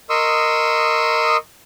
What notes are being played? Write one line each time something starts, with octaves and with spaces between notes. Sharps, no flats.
A#4 D#5 C6 C#6 D#6 E6